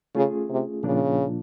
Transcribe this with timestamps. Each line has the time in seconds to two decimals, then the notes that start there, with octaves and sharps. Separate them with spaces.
0.14 C#3 A3 C#4 F4 G#4
0.50 C3
0.83 A#2 C#3 F3 A#3 D4 F4